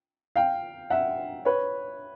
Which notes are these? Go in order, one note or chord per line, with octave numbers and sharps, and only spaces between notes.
F5 G5
E5 F#5
B4 C#5